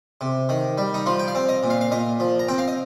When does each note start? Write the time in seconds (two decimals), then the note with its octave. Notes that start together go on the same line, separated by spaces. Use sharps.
0.21 C3
0.49 D#3
0.78 G3
0.94 D#4
1.06 F3 F4
1.19 G5
1.28 F5
1.35 C4
1.49 D#5
1.63 A#2
1.70 F5
1.81 F5
1.91 A#2 D#5
2.20 F3
2.39 A#5
2.48 C4 G5
2.58 F5
2.68 D#5